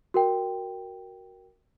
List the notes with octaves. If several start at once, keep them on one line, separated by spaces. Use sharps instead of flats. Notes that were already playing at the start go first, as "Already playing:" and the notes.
F#4 A#4 G5